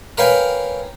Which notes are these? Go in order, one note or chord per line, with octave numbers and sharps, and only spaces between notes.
A#4 B4 C#5 F5 G5 G#5